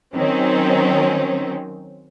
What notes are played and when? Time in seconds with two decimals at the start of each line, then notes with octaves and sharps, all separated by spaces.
0.14 D#3 F#3 C4 C#4